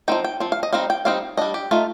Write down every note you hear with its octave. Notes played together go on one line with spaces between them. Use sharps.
F3 C4 D#4 G5
G5
F3 C4
F5
D#5
G3 C4 D#4 F5
G5
G3 C4 D#4 F5
G3 D4 D#5
G4
A3 D#4 F4